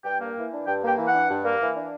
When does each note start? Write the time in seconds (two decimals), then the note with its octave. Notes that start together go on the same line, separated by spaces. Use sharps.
0.04 G2 G5
0.20 A#3
0.36 E3
0.51 D4
0.66 G2 G5
0.82 A#3 G5
0.97 E3
1.08 F#5
1.13 D4
1.28 G2
1.43 A#3
1.60 E3
1.75 D4